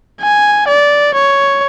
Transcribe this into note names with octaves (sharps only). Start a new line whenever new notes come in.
G#5
D5
C#5